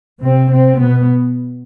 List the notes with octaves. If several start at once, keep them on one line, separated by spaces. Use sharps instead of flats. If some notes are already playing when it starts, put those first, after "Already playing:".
C3 C4
C3 C4
B2 B3